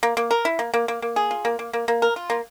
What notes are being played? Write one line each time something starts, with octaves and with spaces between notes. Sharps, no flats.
A#3
A#3
A#4
E4
A#3
A#3
A#3
A#3
G#4
F4
A#3
A#3
A#3
A#3
A#4
F4
A#3